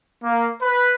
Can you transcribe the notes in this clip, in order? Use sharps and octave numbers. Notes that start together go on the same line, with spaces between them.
A#3
B4